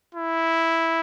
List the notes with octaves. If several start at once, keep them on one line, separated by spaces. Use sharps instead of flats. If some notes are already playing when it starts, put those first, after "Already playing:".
E4